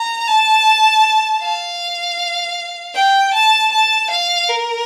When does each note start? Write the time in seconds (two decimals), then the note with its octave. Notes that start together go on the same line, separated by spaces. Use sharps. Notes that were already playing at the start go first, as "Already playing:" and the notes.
Already playing: A#5
0.27 A5
1.42 F5
2.95 G5
3.34 A5
3.72 A5
4.10 F5
4.49 A#4